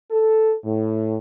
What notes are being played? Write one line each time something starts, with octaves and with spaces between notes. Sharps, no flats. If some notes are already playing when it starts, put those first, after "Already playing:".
A4
A2